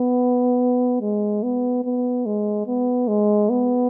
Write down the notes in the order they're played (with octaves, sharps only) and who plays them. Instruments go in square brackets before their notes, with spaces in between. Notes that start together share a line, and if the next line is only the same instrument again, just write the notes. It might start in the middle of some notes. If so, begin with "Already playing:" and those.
Already playing: [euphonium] B3
G#3
B3
B3
G#3
B3
G#3
B3